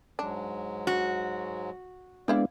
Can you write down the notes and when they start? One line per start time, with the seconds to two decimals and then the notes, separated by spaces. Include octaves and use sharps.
0.19 G#2 F#3 G#3 D4
0.87 F#4
2.28 G#3 B3 C4 D4 E4 D5 F5